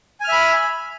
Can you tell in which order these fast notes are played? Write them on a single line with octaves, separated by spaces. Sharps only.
G#5 F6 E5 B5